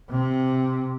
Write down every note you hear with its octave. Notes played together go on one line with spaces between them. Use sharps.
C3